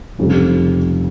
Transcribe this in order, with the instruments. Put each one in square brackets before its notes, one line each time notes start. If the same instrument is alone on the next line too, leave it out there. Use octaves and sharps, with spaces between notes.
[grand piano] F1 F2 C#3 G3